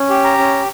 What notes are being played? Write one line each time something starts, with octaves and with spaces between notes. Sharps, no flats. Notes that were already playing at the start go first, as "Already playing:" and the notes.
Already playing: C#4
G4
A#5
C#4